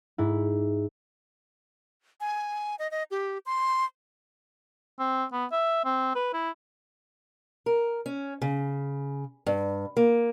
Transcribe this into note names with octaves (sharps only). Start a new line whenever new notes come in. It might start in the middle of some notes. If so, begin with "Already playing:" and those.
G#2 E4
G#5
D#5
D#5
G4
C6
C4
B3
E5
C4
B4
E4
A#4
C#4
C#3
G2
A#3